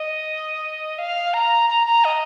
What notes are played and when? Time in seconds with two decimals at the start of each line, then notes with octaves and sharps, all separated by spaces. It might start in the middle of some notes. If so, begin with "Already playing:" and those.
Already playing: D#5
0.98 F5
1.34 A#5
1.70 A#5
1.87 A#5
2.04 D#5